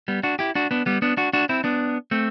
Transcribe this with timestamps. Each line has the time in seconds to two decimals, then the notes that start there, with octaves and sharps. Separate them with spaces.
0.08 G3 B3
0.23 D4 F#4
0.39 E4 G4
0.55 D4 F#4
0.71 B3 D4
0.86 G3 B3
1.02 B3 D4
1.17 D4 F#4
1.33 D4 F#4
1.49 C4 E4
1.64 B3 D4
2.11 A3 C4